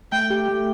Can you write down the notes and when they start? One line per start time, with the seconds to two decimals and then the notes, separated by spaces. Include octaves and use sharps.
0.12 A3 G5
0.30 G4
0.49 A3